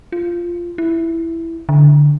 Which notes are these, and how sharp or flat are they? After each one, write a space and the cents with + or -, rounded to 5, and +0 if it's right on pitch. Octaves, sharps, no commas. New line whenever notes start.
F4 -10
E4 +5
D3 -5